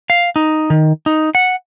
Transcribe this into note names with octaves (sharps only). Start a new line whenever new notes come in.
F5
D#4
D#3
D#4
F#5